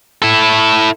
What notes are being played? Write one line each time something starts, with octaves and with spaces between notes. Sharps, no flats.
E4 A4